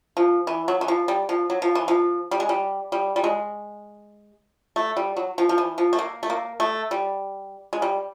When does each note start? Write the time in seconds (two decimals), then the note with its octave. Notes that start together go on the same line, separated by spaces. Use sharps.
0.17 F3
0.47 E3
0.68 F#3
0.81 E3
0.88 F3
1.08 G3
1.29 F3
1.50 F#3
1.62 F3
1.75 E3
1.88 F3
2.31 G3
2.40 G#3
2.49 G3
2.92 G3
3.16 G3
3.24 G#3
4.76 A3
4.97 G3
5.17 F#3
5.38 F3
5.49 F3
5.58 E3
5.78 F3
5.93 A3
5.99 A#3
6.23 A3
6.30 A#3
6.60 A3
6.91 G3
7.73 G#3
7.82 G3